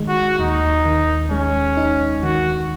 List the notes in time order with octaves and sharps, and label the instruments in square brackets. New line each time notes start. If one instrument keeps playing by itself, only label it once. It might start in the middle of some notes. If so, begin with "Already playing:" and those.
Already playing: [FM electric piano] D#3 G#3
[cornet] F#4
[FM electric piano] D#2 [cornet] D#4
[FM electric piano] D#3
[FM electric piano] G#3 [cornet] C#4
[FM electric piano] D#4
[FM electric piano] D#3 [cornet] F#4